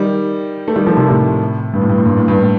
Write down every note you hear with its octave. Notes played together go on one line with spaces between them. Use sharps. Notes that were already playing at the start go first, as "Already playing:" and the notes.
Already playing: D#3 G3
A3
D#3 G3
F3 A3
C3 D#3
A2 C3
G2
A2
G2
A2
G2 A#2
A2
G2
A2